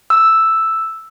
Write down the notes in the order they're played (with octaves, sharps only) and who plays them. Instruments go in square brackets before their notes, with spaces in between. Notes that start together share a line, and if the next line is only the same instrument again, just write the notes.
[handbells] E6